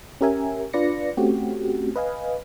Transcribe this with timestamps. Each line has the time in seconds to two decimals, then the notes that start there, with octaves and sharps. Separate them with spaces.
0.21 C#4 G4 A#4 E5 G#5
0.73 D4 F4 B4 D5 A#6 C#7
1.17 A3 C4 C#4 F#4 G4
1.96 B4 D#5 F5 G#5